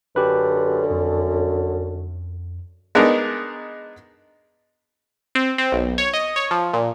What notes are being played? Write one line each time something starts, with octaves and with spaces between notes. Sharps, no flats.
F#2 D3 G4 B4
F2
G#3 B3 D4 D#4 A#4
C4
C4
B1
C#5
D#5
C#5
F3
A#2